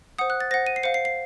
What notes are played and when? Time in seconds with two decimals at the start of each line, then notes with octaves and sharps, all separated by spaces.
0.19 C5 F#5 D#6
0.30 F#6
0.41 A6
0.51 C5 F#5 A#6
0.67 D#7
0.76 C7
0.83 C5 F5 C#7
0.94 C7
1.05 C7